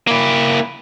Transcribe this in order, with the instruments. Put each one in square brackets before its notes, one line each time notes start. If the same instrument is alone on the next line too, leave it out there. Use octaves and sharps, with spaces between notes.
[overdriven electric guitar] A#3 E4